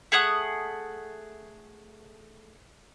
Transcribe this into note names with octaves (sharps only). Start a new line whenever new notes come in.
A3 G#4 F#5 D#6